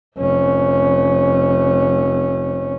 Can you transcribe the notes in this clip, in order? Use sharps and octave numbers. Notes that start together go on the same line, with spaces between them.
F1 C#4